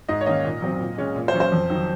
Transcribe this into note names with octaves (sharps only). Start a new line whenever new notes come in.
G#2 D#5
C#5
D#3 A#3 C#4 D#5
A#2
F#3 C4
A#2
G#3 C#4
A#2
C5
F#3 C#4
C5
F2
D#3 F#3